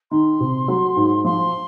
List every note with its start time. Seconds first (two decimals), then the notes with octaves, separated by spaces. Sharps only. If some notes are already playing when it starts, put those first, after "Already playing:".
0.11 D#3 C6
0.40 C3
0.68 F#3
0.96 G#2
1.25 F3 C6